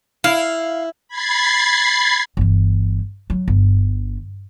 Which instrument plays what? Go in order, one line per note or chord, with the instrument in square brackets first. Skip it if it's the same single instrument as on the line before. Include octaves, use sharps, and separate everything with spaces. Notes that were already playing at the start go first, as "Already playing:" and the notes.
[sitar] E4 [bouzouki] F5
[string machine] B5 G#6 A6 C7
[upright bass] G1 E3
F#3
G1